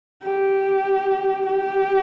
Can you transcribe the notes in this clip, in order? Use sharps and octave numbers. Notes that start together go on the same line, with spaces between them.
G4
G4